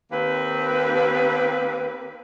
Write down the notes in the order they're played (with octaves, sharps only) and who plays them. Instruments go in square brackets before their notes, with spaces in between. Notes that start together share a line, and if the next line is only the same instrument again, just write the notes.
[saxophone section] D#2 A#3 C4 B4